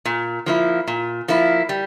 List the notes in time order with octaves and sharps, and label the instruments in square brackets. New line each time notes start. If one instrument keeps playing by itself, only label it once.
[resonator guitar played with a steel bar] A#2
F3 A#3 E4
A#2
F3 A#3 E4
G3